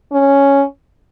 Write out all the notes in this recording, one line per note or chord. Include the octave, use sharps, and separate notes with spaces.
C#4